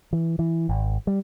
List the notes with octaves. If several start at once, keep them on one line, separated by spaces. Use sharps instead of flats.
E3
E3
G#1
G3